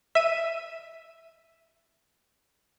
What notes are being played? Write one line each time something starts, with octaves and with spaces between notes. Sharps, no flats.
E5 D#7